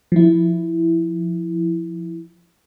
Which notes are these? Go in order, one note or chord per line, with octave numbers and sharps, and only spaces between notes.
F3 E4